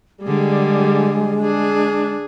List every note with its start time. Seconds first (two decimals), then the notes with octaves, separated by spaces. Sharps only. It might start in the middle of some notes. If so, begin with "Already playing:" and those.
0.24 D3 G3 G#3 G#4
1.41 D4 G#4